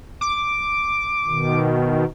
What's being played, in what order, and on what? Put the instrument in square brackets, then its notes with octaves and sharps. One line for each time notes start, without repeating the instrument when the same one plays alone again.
[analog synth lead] D6
[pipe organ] B2 D#3